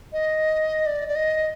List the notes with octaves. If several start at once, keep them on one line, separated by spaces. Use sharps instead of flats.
D#5
D5
D5
D#5